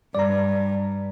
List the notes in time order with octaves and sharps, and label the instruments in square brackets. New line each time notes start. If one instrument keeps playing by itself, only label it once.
[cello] G2 [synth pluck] D5 A#5